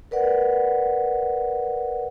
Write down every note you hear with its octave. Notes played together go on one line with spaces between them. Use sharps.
A#4 B4 D5 F#5